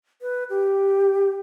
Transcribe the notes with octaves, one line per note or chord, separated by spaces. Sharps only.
B4
G4